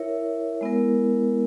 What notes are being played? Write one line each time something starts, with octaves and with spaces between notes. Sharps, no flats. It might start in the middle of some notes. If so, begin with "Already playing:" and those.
Already playing: E4 A#4 C#5 E5
G#3 B3 E4 A#4